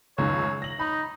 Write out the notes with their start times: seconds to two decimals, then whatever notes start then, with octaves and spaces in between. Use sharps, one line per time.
0.18 C#2 F#2 D#3 C#5
0.62 A#6 F#7
0.79 D#4 B5